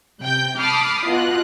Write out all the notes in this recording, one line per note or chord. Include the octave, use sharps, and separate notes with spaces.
C3 G5 G6
A5 B5 D6 D#6 F6 C7
B2 F4 D#5 F#6